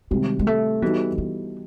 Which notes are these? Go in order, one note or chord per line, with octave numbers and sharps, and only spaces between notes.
C3 D#3 G3 G#3
G#3
A3
E3 G3 B3 D#4 F#4 A4
E3